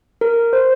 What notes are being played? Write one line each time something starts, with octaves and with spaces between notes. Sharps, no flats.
A#4
C5